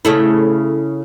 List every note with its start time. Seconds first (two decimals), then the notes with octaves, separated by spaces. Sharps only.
0.05 C#3 A3 E4